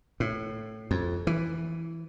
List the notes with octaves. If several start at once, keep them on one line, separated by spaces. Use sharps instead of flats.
A2
F2
E3